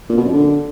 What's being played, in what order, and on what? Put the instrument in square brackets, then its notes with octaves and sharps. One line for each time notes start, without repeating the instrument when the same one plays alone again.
[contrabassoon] A#2
B2
F#2
D3